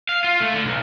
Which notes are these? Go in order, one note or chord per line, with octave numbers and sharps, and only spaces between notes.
F5
F4
A3
D3
B1